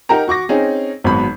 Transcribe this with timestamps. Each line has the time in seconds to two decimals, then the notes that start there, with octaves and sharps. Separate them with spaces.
0.09 D#4 G4 A#4 F#5 A#5
0.28 F#4 C#6 D6 A#6
0.49 C4 C#4 D#4 G#4
1.04 G#1 G#2 F#3 B3 B5